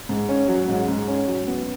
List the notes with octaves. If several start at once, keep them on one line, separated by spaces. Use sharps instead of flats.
G#2
C#4
F#3
G#2
G#2
C#4
F#3
B3